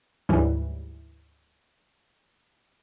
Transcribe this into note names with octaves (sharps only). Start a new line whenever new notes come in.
D2 G#2 E3 F#3 G3